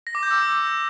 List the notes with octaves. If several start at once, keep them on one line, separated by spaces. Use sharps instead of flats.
A#6
D6
G6
E6
D6